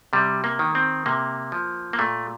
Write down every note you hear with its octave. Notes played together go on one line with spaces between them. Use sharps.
C3 G3
A#3
D#3
C4
C3 A#3
F3
A#3
A#2 A3